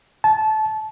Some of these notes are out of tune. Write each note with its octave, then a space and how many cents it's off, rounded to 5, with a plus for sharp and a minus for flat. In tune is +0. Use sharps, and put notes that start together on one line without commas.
A5 -20